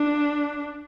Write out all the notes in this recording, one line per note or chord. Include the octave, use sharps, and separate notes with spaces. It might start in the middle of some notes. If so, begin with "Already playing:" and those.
Already playing: D4